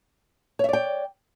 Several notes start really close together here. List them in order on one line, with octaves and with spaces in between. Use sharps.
C#5 E5 D5 G5